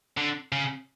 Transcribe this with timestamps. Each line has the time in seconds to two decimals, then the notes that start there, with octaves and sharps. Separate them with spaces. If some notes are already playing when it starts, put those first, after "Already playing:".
0.17 D3
0.52 C#3